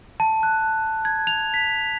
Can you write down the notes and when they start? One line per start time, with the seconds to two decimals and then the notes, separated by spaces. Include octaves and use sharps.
0.20 A5
0.43 F#6
1.05 G#6
1.27 F7
1.54 B6